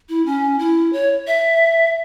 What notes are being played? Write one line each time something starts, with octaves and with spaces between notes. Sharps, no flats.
E4
C#4
E4
C#5
E5